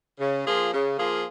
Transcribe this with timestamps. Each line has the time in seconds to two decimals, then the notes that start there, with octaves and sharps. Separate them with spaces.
0.20 C#3
0.45 F3 A#3 F4 G#4
0.72 C#3
0.98 F3 A#3 F4 G#4